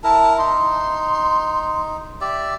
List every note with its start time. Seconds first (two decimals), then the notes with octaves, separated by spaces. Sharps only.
0.04 E4 A#4 A5
0.38 D#4 C6
2.21 G4 D5 E5